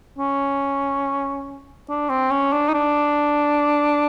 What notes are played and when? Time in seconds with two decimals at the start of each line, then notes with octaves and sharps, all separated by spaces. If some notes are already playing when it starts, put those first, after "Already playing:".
0.19 C#4
1.89 D4
2.09 C4
2.31 C#4
2.52 D4
2.68 D#4
2.74 D4